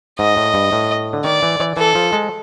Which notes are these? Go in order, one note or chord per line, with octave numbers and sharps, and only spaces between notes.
G#2 D#5
A2
G2
A2
D3
D#3 D5
E3
E3
E3 A4
F3
G#3